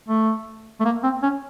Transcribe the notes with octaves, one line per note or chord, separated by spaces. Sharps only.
A3
A3
A#3
C4
C#4